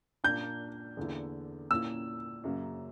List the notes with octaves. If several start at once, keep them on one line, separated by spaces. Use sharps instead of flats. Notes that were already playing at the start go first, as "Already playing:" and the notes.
A#2 A#3 D4 G6
E2 D3 A#3 E4
A#2 A#3 C#4 E4 E6
F#2 C#3 F#3 A#3